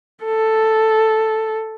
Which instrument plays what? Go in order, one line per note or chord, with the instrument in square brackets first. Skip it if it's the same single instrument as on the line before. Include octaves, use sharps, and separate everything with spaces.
[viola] A4